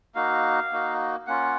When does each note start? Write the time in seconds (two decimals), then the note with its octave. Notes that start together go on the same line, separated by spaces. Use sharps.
0.15 A#3 D#4 F#4 F5
0.72 A#3 D#4 F#4
1.27 A#3 C#4 F4 F#5